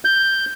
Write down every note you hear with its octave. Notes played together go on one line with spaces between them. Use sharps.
G6